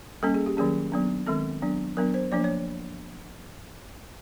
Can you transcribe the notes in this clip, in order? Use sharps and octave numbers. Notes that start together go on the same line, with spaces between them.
G3 A#3 C#4 A4
G#4
G4
D#3 F#3 A#3 C#4 G#4
F#3 B3 D4
D#3 G#3 C4 A4
F#3 B3 D4
F#3 B3 D4 A#4
C5
F3 A#3 D4 D5
C#5